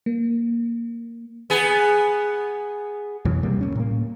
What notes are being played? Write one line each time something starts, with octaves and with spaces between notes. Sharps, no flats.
A#3
B3 G#4
F2 B2 E3 F#3
C3 G3 A#3
D1 G1 C#4
A2 A#3